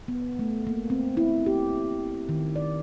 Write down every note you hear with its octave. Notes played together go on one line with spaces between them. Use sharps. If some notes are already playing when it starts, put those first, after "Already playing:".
B3
A3
A#3
C4
E4
G4
D#3
D5